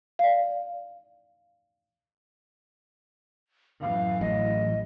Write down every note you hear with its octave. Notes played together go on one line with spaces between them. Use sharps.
D5 F5
F#2 A2 E3 F5
A1 D#5